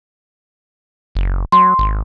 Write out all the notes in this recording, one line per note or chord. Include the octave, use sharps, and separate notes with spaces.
F#1
F#3 C6
G#1